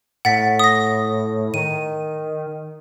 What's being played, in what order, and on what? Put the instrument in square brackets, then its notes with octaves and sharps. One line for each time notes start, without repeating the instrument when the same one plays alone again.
[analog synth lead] A2 [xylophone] F#5 A6 B6
[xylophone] D#6 A#6
[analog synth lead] D#3 [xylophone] D#7